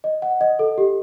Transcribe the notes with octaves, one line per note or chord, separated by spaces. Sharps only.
D#5
F#5
D#5
A4
G4